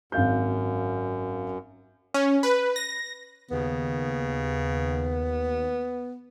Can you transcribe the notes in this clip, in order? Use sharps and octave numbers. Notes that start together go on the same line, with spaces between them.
G#1 F#2 F5 G6
C#4
B4
A#6
D#2 C#3 B3